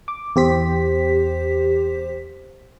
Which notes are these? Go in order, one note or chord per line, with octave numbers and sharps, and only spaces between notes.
D6
E2 G4 C5 B6